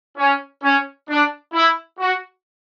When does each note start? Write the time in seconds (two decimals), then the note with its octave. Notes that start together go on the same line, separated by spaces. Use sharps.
0.18 C#4
0.64 C#4
1.10 D4
1.54 E4
2.00 F#4